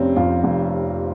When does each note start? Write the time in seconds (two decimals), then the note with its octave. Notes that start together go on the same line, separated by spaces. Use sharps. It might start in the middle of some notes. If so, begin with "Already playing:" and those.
Already playing: F1 C3 C4 C#4
0.16 F2 F4
0.44 F1